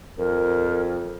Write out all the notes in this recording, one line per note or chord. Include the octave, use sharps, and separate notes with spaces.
F2 A#4